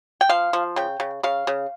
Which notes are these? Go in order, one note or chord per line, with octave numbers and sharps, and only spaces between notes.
G5
F3 F5
F3
C#3 G5
C#3
C#3 F5
C#3